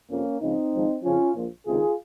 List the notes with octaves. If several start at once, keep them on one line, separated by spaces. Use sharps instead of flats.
F2 C3 F3 A#3 C#4
C#2 C#3 F3 C4 D#4
G#1 G#2 F3
F2 C#3 F3 C#4 F4
A#1 A#2 F3
C#2 C3 D#3 F4 G#4